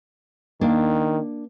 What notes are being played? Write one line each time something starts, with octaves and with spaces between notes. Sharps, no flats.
D#3 A#3 D4